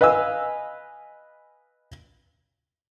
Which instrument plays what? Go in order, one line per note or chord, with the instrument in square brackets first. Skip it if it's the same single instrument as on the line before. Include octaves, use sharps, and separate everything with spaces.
[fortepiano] B4 D#5 F5 G#5 E6